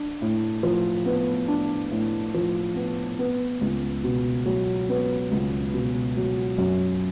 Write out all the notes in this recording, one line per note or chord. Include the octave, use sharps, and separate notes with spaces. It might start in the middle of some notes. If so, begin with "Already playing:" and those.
Already playing: D4
A2
F3
B3
D4
A2
F3
B3
B3
C#2
B2
F#3
B3
C#2
B2
F#3
F#2